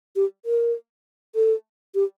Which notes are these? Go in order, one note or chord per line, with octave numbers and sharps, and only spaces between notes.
G4
A#4
A4
G4